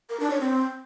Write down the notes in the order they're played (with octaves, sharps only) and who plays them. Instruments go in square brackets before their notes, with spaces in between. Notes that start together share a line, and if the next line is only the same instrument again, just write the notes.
[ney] A#4
D4
C#5
C4